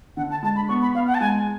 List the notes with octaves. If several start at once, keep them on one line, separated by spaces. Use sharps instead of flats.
D3 F#5
A5
G#3 A5
B5
B3 C#6
B5
B3 F5
F#5
A5
G#3 G#5